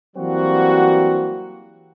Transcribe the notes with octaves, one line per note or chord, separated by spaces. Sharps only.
E3 F#3 G3 A#3 C4 F#4